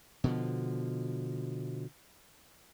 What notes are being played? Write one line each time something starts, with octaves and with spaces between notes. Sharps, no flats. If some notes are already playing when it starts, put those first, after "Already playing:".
B2 D3 F3